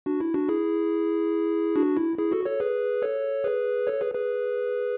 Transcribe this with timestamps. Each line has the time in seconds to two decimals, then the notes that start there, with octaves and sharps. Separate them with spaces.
0.06 D4 F#4
0.20 E4
0.34 D4 F#4
0.49 E4 G#4
1.76 D4 F#4
1.97 E4
2.18 E4 G#4
2.32 F#4 A4
2.46 A4 C#5
2.60 G#4 B4
3.02 A4 C#5
3.44 G#4 B4
3.87 A4 C#5
4.01 G#4 B4
4.15 G#4 B4